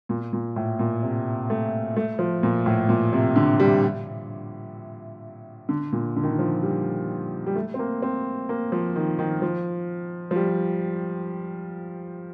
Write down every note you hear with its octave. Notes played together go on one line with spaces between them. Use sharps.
A#2
A#2
A2
A#2
C3
A3
A3
F3
A#2
A2
A#2
C3
D3
G3
D3
A#2
D3
D#3
D3
F3
G3
G3
A3
C4
A#3
C4
A#3
F3
D#3
D#3
F3
F3
G3